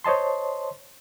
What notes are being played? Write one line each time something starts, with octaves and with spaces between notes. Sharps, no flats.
C5 C#5 D#5 A5 C6